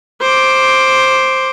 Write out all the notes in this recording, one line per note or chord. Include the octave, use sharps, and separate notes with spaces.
C5 D6